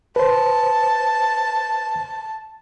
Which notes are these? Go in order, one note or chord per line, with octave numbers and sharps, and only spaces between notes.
B4 C5 A5